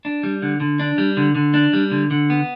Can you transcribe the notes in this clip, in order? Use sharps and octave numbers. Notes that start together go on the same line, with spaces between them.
D4
G3
D3
D3
D4
G3
D3
D3
D4
G3
D3
D3
B3